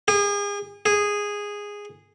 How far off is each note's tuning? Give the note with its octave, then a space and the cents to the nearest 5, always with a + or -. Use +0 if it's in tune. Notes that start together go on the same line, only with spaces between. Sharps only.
G#4 -35
G#4 -10